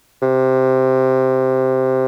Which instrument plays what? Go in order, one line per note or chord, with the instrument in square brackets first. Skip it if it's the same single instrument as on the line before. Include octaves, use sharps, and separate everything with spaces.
[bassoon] C3